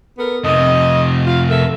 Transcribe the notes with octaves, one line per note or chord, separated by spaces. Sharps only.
B3 A4 A#4
F2 C3 D#5
F4 F5
A4 A#4 E5